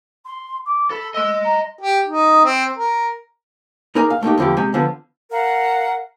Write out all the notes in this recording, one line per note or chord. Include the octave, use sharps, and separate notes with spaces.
C6
D6
A4 B5
D#5 C6 E6
A#5
G4
D#4
C4
A#4
D#4 G#4 A#4 D5 G#5 A#5
F5
A3 A#3 D#4 G4
E2 D3 F3 A3 G4
C3 G#3 G4 G#5
D3 F3 B3
A#4 F5 F#5